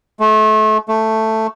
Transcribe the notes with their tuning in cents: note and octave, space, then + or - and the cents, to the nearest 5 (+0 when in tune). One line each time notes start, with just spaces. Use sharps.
A3 -30
A3 +5